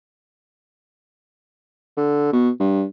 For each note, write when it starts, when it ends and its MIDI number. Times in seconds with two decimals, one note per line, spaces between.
1.97 2.29 50
2.33 2.49 47
2.60 2.84 43